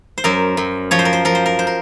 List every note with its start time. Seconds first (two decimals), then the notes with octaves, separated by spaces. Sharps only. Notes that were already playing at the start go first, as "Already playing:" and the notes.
0.18 C5
0.24 F#2 A#4
0.57 F#2
0.91 F3 C#5
0.99 C5
1.05 A#4
1.13 C5
1.25 F3 A#4
1.35 C5
1.46 A#4
1.59 C5
1.67 A#4